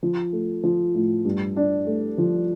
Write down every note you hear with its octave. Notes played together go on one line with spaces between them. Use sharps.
F3
A3
F3
A2
G2
D4
A3
F3